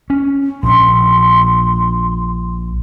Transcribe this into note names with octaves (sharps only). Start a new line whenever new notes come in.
C#4
A#1 C6